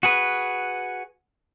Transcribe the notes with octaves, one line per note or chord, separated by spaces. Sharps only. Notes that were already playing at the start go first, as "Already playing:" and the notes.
F#4 G#4 B4